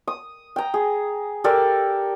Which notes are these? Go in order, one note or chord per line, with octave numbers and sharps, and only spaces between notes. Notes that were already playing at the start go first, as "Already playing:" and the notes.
D#6
G5 A#5
G#4
G4 A4 A#4 D5